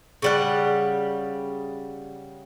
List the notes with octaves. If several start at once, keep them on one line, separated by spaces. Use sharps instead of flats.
C#3 G3 F#5